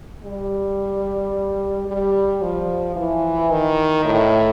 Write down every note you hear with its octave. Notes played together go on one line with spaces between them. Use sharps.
G3
G3
F3
E3
D#3
A2